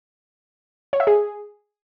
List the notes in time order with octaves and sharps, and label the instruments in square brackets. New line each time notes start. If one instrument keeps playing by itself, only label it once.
[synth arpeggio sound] C#5
E5
G#4